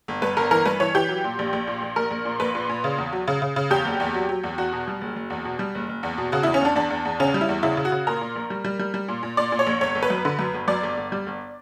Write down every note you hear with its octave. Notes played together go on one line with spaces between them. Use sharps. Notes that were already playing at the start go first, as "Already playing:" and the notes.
G1
G2 B4
G1 A#4
E3 A#4
G2 B4
E3 C#5
E3 G4
F#3
A#2
A#1
A#1
A#2
A#1
A#1 A#4
A#1
A#2
A#1 B4
A#2
A#2
C#3
E2
F#3
C#3
C#3
C#3
E2 G4
F#1
E2
F#3
F#3
E2
E2 F#4
B2
G3
F#1
F#1
E2
B2
G3
F#1
F#1
E2
B2
C#3 F#4
E2 E4
C#4
E2 D4
E2 D4
E2
E2
C#3 C#4
G3
E4
E2
C#3 E4
C#3
F#4
C#3
A#2 A#4
A#2
A#1
G3
G3
G3
G3
A#2
A#2
A#2 D5
A#2
C#5
A#1
G1 C#5
G1
B4
F#2
D3
F#2
G1
F#2 D5
G1
G1
G3
G1